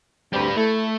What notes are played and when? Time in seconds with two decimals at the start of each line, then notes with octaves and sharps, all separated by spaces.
0.33 D2 G3 C4 G4 B4
0.57 A3 E4 A4